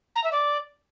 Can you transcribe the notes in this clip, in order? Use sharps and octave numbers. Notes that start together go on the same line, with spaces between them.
A#5
E5
D5